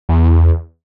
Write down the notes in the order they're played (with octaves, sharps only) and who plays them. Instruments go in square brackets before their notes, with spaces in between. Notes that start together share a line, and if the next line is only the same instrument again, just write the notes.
[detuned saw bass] E2